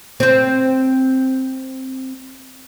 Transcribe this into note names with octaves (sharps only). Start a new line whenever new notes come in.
C4 C5